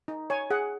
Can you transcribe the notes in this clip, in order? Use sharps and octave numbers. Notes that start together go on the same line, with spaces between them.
D#4
C#5 G#5
G#4 F#5